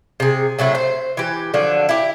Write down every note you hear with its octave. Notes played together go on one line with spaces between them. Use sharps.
C3 G#4
C3 F#3 A3 E4
C5
E3 G4
D3 F3 F#3 D4
E4 G4